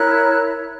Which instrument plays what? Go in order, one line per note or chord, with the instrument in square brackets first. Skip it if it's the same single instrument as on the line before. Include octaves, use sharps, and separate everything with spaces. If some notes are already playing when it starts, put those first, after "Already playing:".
Already playing: [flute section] E4 A#4 C#5 F#6